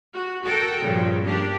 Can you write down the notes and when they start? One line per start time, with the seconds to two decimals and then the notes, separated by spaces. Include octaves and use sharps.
0.14 F#4
0.43 F#4 A4 A#4 G5
0.81 G2 A#2 C#3 F3
1.25 A#3 D4 G4